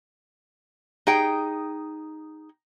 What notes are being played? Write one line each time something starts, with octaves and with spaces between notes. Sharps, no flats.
D#4 G#4 G5